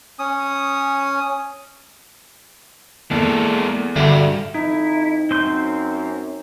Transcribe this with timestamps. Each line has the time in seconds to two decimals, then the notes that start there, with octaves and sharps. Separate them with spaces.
0.19 C#4 D#6
3.11 E2 G#3 A#3 A4
3.96 G2 D3 F#4 E5
4.54 F2 D#4 E4
5.31 F#2 C4 C6 G6